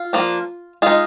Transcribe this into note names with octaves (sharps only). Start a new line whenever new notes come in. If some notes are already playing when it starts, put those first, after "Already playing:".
Already playing: F4
F3 A#3 D4
G#3 D#4 F4 G#4